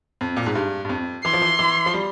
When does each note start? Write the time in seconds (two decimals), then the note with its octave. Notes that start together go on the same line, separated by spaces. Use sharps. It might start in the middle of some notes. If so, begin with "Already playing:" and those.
0.21 F2
0.37 A#2
0.46 G#2
0.55 G2
0.85 G2
0.89 F2
1.25 E3 C6
1.33 F3
1.42 E3
1.59 E3
1.86 F3
1.94 G3